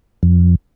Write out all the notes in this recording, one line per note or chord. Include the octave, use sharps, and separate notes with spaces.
F2